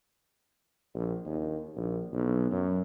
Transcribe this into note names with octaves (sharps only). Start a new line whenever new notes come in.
A#1
D#2
A#1
B1
F#2